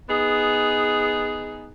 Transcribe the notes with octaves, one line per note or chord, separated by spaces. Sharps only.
B3 D#4 G#4